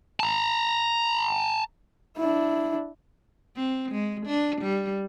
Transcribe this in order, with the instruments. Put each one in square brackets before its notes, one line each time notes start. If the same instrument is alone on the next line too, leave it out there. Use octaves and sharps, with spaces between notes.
[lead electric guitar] A5 A#5
[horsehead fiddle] D4 E4
[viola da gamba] C4
G#3
D4
G3